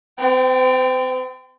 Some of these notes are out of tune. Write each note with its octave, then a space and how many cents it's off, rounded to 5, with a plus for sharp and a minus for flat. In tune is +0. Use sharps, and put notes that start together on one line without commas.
C4 -40 G5 +0